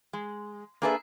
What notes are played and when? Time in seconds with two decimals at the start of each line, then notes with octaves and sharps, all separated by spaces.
0.13 G#3
0.82 A#3 D4 G#4 A4 B4 E5